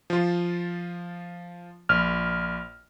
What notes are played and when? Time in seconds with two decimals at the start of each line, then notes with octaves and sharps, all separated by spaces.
0.10 F3 F4
1.89 A#1 F6